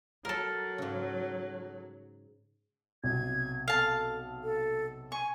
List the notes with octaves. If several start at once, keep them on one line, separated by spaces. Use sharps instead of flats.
F#3 A4 A#4
G#2 C#3
B1 C3 G#6
A4 F5 A5
A4
G#5 C#6